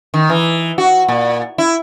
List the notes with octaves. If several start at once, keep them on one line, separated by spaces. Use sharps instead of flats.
D#3
E3
F#4
A#2
E4